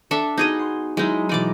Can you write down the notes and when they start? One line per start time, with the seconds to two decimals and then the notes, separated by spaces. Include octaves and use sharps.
0.11 D4 A4 E5
0.38 B3 D#4 F#4 G#4 D#5
0.59 C6
0.97 F#3 G#3 D#4 E4
1.29 B2 E3 G#3 D#4 D5 D6